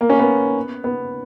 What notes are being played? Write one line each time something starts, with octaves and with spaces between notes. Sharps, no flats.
A#3
C#4
B3
B3